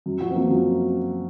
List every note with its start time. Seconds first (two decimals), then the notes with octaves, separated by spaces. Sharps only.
0.06 F#2
0.21 F3 F#4
0.30 C4
0.35 F3 A#3
0.50 F#2